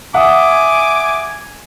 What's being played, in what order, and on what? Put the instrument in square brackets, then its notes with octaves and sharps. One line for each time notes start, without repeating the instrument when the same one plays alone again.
[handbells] E5 D#6 [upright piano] F#5 [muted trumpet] G#5 [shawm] D6